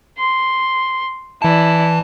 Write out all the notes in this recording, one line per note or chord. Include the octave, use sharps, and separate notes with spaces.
C6
E3 E4 D5 A5